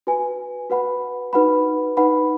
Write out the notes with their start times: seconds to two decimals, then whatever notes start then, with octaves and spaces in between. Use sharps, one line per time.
0.07 F#4 B4 G#5
0.70 F#4 B4 F#5 B5
1.33 D#4 F#4 B4 F#5 B5
1.97 D#4 B4 F#5 B5